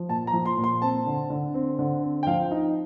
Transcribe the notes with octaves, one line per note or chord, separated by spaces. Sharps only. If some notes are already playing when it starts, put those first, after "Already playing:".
Already playing: F3
A#2 A5
A#5
F3
C6
A#2
C6
C4 A5
D3
D3
C4
D3
C4
G5
F3 F5
D#4